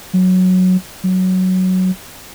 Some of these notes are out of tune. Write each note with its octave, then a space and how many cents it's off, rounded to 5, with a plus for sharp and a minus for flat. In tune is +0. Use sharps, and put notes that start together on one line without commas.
F#3 -5
F#3 +5